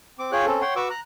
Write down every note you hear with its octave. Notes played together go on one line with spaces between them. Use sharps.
C4 D6
F4 G#4 C#5 G5 F#6
C4 C#4 A4
C#5 F#5 G5 C6
F#4 B4 C#6 D6 E6
A#5 F#6